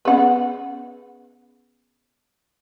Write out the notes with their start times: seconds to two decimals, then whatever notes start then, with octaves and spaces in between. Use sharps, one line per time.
0.05 B3 C#4 G#4 B4 F#5